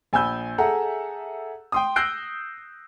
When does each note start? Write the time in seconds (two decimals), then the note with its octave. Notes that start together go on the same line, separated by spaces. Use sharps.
0.13 A#1 G#5 B5 E6 G6
0.58 G#4 A4 E5 F#5 A#5
1.72 G5 C6 D#6
1.96 E6 F#6 G6 A#6 C7 D7